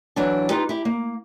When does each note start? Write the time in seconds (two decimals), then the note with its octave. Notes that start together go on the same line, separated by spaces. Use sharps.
0.16 E3 F#3 D4
0.50 D#4 F4 G4 B4
0.69 E4 G4
0.85 A#3